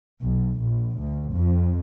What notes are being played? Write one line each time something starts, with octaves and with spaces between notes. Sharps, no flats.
B1
A#1
D2
F2